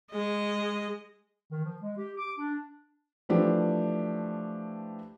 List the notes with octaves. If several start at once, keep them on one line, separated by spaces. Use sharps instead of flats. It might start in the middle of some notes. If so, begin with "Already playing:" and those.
G#3 D#5
D#3
F3
G#3
G4
D6
D4
E3 F3 A3 D4 G4 C5